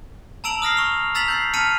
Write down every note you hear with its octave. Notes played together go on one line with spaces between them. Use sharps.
A5 A#5 E6 D7 F7 F#7
D#6 F6 A#6 C7
C#6 F7
A#5 E6 A6 B6 F7 F#7
G6 A6 C7
A5 F6 B6 C#7 D#7 F7